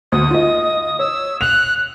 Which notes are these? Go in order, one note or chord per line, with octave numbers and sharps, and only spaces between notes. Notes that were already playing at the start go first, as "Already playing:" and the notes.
D2 D#6
F4 D#5
C#5 E6
F#6 F7